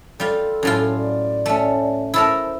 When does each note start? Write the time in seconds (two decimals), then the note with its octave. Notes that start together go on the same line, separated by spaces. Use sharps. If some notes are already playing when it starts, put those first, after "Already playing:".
0.20 G3 F4 A4
0.63 F#2 A2 F4
0.97 D5
1.46 A3 C#4
2.14 E4 A4 A#4 C5